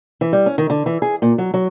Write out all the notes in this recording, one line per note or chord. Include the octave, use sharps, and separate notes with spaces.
E3
G3
C#4
D#3
D3
E3
G#4
A#2
F#3
F#3